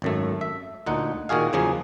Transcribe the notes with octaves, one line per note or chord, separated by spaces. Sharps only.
G#1 F#2 A3
E5
D2 A#2 D#4 F#5
A#2 D#3 F#4 G#4 F5
E2 C#3 F3 F#3 G#4